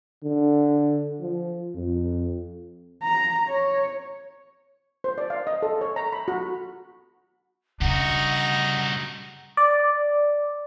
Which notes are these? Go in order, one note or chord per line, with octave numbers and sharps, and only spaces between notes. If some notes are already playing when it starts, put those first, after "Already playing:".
D3
F3
F2
A#5
C#5
C5
D5
F5
D#5
A4
C#5
A#5
B5
F#4
G2 C#3 D#4 F#4 F#5
D5